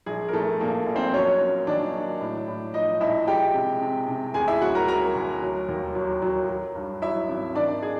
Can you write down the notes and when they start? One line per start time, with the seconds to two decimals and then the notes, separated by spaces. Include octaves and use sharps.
0.06 A#1 G#4
0.28 A#4
0.33 A#1 A3 A4
0.60 A#1 A#3 A#4
0.87 A#1
0.96 C4 C5
1.13 F#3 C#4 C#5
1.41 A#3
1.67 D#3 D4 D5
1.94 F#3
2.21 A2
2.48 A2
2.74 F3 D#4 D#5
3.01 A#1 E4 E5
3.27 G#3 G4 G5
3.54 C3
3.81 C3
4.08 C3
4.34 D2 G#4 G#5
4.48 E4 E5
4.61 F#3 F#4 F#5
4.75 A#4 A#5
4.88 F#3 A#4 A#5
5.15 D2
5.42 F#3
5.68 D#2
5.95 F#3
6.22 F#3
6.49 F#3
6.75 G2
7.02 F#3 E4 E5
7.29 G#1
7.55 D#3 D4 D5
7.82 G#4